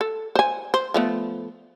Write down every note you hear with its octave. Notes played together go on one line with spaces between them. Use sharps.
A4
C5 G#5
C5
F3 A3 B3